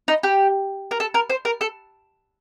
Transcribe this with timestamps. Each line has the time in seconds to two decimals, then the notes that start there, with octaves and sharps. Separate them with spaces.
0.08 D#4
0.23 G4
0.91 A#4
1.00 A4
1.14 A#4
1.30 C5
1.45 A#4
1.61 A4